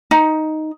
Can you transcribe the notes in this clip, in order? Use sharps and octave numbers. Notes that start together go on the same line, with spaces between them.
D#4